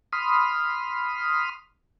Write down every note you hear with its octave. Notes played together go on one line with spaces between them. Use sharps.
B5 C6 D#6 F6